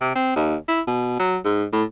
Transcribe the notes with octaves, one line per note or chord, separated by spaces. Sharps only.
C3
C4
D#2
E4
B2
F#3
G#2
A2